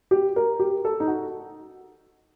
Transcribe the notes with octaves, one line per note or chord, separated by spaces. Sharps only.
G4
A#4
G4
A4
D#4
F#4